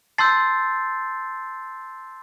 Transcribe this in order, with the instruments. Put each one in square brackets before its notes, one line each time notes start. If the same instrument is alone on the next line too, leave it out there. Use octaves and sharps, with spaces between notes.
[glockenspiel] A5 C6 E6 G6 A6 C7